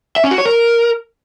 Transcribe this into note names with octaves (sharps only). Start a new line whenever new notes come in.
E5
C#4
F#4
C#5
A#4